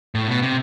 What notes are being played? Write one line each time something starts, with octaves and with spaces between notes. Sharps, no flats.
A2
B2
C3